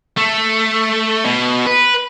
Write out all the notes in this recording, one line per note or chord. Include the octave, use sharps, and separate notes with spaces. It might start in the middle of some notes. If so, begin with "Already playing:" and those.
A3
B2
B4